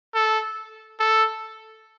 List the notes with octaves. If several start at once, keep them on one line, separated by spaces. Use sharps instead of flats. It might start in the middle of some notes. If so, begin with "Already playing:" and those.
A4
A4